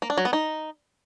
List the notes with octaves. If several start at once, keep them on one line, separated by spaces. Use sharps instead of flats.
A#3
D4
F#3
B3
D#4